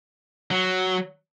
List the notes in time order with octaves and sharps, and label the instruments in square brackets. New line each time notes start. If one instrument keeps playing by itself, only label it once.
[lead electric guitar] F#3